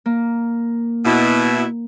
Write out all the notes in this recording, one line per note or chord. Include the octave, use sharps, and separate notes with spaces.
A#3
B2 E4